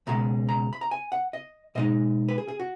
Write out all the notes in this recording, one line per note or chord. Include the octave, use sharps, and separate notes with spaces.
C#2 B2 G#3 A#5
A#5
B5
A#5
G#5
F#5
D#5
B2 G#3 D#4 D#5
B4
G#4
G#4
F#4